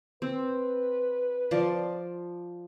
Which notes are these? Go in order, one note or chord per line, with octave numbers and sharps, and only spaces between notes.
C4 B4
F3 D5 C6